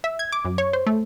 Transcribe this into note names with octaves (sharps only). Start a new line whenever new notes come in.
E5
G#6
D6
F#2
C#5
C5
A3